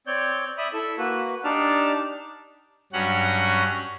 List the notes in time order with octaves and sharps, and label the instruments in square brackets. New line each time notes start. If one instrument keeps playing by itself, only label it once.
[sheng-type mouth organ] C4 C#5 D5 G6
D5 E5 B5 D#6
E4 A4 E5
A#3 F#4 B4
D4 D#4 G4 D5 A5 F6
[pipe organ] G2 F#3 C#4 F#4 F#5 F#6